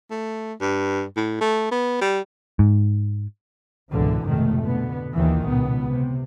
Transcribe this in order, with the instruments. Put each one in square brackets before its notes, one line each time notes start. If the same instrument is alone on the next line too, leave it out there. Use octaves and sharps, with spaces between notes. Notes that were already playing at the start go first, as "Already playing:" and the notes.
[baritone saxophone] A3
G2
A2
A3
B3
G3
[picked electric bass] G#2
[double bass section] G#1 C#2 B2 D3 E3
F1 G#2 B2 D#3 A3
B2 D3 B3
A#1 D#2 A#2 D#3 E3
C#2 B2 B3
C3